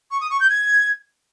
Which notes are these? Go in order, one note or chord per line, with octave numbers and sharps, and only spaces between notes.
C#6
D#6
C#6
G6
G#6